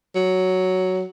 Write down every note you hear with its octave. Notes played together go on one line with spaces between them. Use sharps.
F#3